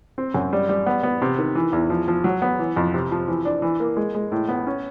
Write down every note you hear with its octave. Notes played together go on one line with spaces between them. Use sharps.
C4
F#2
G3
G3
B3
B3
C3
D#3
E3
E2
F3
F3
F#3
B3
E3
F2
C3
F3
E3
D4
E3
A#3
G#3
G#3
A2
B3
C#4